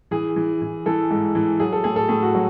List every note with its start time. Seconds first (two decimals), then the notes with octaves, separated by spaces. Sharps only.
0.11 E3 G#4
0.36 E3
0.62 E3
0.86 E3 A4
1.11 G#2
1.35 E3
1.60 F#3 G#4
1.73 A4
1.84 A2 G#4
1.96 A4
2.09 A2 G#4
2.23 F#4
2.35 F#3